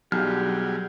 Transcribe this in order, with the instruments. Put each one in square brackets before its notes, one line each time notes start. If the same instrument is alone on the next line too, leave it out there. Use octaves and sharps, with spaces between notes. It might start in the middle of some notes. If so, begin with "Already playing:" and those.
[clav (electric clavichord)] B1 [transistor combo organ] F#3 G3 G#4 [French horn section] D4 F4 G4 [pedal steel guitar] F6